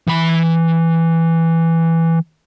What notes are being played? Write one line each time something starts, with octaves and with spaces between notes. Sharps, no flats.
E3 B5